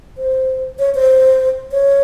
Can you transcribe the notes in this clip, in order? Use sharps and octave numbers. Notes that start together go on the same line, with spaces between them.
C5
C#5
C5
C#5